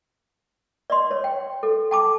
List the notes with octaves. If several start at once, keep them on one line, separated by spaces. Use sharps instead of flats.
D5 D#5 C6
C#5
G5
A4
G5 A5 D6